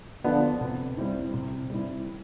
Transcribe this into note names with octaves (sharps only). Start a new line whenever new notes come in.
D3 F3 B3 D4
C3
G3 C4 E4
C3
G3 C4 E4